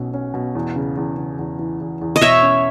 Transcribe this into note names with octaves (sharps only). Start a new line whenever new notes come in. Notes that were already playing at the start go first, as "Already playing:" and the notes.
Already playing: B1 B2 C#4
C#4
B2
E2
C#3
E2
C#3
E2
E3
E2
E2
D#5
B2 C#5 E5
C#4